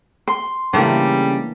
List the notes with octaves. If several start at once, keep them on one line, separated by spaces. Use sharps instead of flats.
C6
C#3 E3 G3 A3 A#3 D4